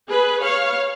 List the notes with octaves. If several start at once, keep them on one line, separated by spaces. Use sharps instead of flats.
G#4 B4
C#5 F5